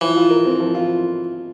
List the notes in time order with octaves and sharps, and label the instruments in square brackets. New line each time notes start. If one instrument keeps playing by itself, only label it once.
[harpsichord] E3 [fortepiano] F3
[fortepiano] F4
A#4
C4
F3
F4